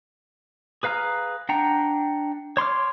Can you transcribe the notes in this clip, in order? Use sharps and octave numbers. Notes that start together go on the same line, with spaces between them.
G#4 B4 F5 A#5 F6
D4 F#5 G5 A#5
C#5 C6 D6 F6